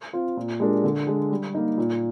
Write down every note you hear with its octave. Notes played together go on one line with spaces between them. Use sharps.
C4 F4
A#2
G#3 D4 G4 A#4
D3
G#3 D4
G3
A#3 D#4
A#2